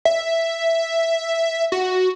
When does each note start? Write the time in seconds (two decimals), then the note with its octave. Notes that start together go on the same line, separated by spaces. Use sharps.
0.05 E5
1.72 F#4